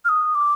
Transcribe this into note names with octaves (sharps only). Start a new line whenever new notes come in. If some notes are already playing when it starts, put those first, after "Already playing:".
F6
D#6
D6